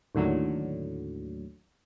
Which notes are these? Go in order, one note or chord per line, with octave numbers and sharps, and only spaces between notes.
D#2 A2 D3 F#3